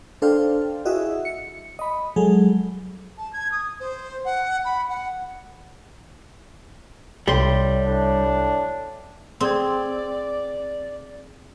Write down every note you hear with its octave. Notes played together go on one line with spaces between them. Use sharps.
D4 A4 C5 F5 G5
E4 F#4 G#4 D#5 E5
C#7
D#5 B5
F#3 G#3 G#4 A4
A5
G#6
D#6
C5
F#5
B5
F#5
C2 A2 G3 C6
A2 D4
C4 G#4 D5 G#6